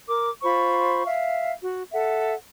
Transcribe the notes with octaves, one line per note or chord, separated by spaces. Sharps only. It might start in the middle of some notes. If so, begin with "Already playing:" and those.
A#4 D6
F4 C5 B5 C#6
E5 F5
F#4
A4 E5 F#5